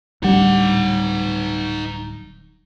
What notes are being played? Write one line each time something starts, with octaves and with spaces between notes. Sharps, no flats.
D1 G3 D4 D#4 F#5